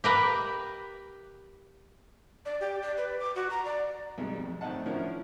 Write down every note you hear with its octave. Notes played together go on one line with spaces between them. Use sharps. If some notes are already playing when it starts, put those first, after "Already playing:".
G4 A#4 B4
D5
G4
D5
B4
D6
F#4
A#5
D5
B1 B2 G3 G#3
F2
A2 D#3 C4 D#5 F#5 A5
D3 F3 C#4 E4 A#4